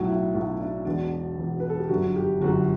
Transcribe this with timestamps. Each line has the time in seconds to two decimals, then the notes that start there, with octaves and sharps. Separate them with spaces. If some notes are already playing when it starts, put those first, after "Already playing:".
Already playing: B1 A2 F#3 F#4
0.08 E4
0.34 B1 A2 F#3 F#4
0.50 E4
0.61 D4
0.85 E1 E2 B2 D4
1.38 E1 E2 B2
1.60 B4
1.69 A4
1.80 G4
1.89 G1 F#2 D3 F#4
2.16 G4
2.41 G1 F#2 D3 F#4